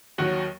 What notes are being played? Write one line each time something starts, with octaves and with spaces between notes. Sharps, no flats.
D#2 D#3 F#3 F#4